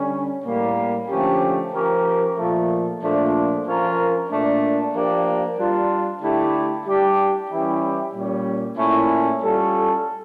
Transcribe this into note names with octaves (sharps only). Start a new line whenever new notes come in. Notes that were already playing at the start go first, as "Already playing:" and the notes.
Already playing: D3 G3 C#4
A2 G3 A#3
D3 F3 A3 C#4 G4
F3 C#4 G4 A#4
A#2 F3 A3
A#2 F3 A3 D4
F3 C#4 F4 A#4
A#2 A3 D4
F3 A#3 D4 G4 A#4
G3 D4 F4
D3 A3 E4 G4
G3 D4 G4
E3 G3 C#4 E4 G4
A#2 G3 C#4
A#2 A3 C#4 E4
G3 C#4 F4 A4